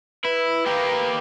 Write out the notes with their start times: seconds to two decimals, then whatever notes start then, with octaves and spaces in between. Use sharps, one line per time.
0.24 E4 B4
0.66 A#3 G4